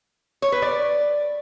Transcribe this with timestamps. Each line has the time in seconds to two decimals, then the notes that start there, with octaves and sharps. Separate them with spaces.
0.42 C#5
0.52 B4
0.62 D5